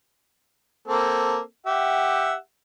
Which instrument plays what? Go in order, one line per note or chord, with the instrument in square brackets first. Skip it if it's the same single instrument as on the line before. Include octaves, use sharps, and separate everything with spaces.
[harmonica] A#3 C4 A4
G4 E5 F#5